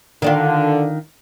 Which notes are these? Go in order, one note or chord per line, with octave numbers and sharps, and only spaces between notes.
D3 D#3 D4 F4